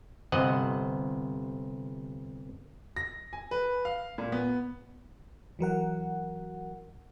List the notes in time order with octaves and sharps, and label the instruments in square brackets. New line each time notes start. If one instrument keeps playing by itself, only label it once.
[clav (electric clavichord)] G1 C3 C5 D#5 F#5
[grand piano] A#6
G#5
B4
F5
A#2
B3
[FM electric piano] E3 F#3 A#4 F#5